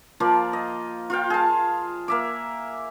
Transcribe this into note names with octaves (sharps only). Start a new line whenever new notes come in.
F3 A#3 F4 D5
D#5
F4 F5 G5
G#4 A5
A#3 E5 D6